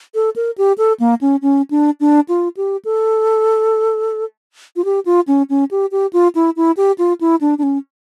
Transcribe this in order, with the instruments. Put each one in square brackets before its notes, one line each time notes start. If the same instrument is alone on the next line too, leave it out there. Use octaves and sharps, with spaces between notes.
[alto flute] A4
A#4
G4
A4
A#3
C#4
C#4
D4
D4
F4
G4
A4
F4
G4
F4
C#4
C#4
G4
G4
F4
E4
E4
G4
F4
E4
D4
D4
C#4